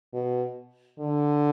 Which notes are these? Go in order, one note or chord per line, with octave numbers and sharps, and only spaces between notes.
B2
D3